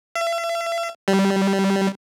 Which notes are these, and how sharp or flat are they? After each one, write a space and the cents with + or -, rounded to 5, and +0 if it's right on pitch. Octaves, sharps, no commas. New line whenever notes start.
E5 +40
G3 -10